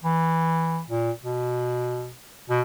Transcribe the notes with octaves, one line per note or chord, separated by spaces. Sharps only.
E3
A#2
B2
B2